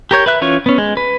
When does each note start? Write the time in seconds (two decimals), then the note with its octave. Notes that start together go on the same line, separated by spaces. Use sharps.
0.11 G4 A#4 C#5 G6
0.26 B4 E5 F#6
0.41 E3 C#4 F4 C#5 C#6
0.66 B3 C#4
0.78 G#3
0.97 B4